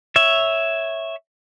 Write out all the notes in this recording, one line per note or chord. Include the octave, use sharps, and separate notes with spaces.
C#5 E5